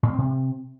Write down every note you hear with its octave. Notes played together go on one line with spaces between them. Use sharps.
A2
A#3
C4
C3